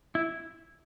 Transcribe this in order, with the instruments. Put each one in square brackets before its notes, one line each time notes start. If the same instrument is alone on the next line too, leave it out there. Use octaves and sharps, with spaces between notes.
[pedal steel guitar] E4